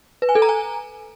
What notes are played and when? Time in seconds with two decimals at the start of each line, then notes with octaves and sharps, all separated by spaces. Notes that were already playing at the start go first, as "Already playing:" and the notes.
0.22 B4
0.29 G#5
0.35 A4
0.42 A#5
0.49 G#5